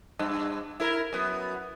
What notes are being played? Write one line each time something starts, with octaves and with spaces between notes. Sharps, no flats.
G2
E4 A#4
F#2 B3